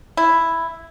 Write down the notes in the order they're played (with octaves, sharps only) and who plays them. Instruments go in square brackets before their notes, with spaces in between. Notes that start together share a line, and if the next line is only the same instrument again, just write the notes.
[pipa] E4